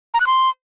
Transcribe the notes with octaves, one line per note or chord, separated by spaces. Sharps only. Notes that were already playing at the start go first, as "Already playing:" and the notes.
A#5
F#6
C6